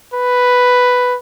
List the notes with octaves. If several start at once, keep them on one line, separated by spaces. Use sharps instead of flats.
B4